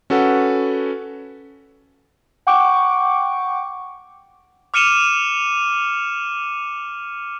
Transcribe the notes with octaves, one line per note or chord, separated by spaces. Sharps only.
C#4 F#4 A4 B4 F#5
F#5 G5 C#6 D6
D6 F6 C#7 D#7 E7 G7